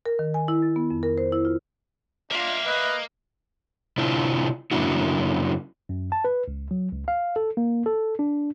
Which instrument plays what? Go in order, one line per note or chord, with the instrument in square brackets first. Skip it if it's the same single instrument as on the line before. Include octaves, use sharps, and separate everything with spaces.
[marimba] A#4
D#3
G#5
E4
A6
B3
F2
A#4
C5
E4
F4
[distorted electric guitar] A#3 [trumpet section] D4 F4 [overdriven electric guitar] E5 F5
[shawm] B4 [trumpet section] D#5
[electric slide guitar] C3 D4 E4 F4
F#2 C#3 A#3 D4 E4 F#4
[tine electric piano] F#2
A5
B4
C#2
F#3
C#2
F5
A4
A#3
A4
D4